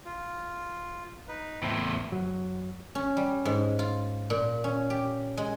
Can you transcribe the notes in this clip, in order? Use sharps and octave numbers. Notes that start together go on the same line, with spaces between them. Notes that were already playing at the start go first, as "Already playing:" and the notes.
F4
D#4 B4
E2 A2 C4 E4
F#2 F#3
C#4
G3
G#2
F4
A#2
C#4
G4
G#3